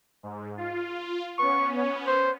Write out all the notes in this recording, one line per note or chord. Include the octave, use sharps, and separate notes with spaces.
G#2
F4
B3 C#4 C#6
C#5
C5